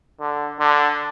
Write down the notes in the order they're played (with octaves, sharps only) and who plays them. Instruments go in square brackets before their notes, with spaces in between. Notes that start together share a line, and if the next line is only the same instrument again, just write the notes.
[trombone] D3
D3